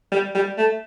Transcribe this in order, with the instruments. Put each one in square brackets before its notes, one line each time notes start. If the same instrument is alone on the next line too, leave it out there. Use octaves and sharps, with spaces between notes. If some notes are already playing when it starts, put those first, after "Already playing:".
[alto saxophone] G3
G3
A3